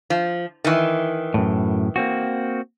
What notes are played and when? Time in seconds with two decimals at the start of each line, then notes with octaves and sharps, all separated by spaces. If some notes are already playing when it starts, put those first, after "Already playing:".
0.10 F3
0.64 D#3 E3
1.34 F#2 A2
1.96 A#3 C4 F#4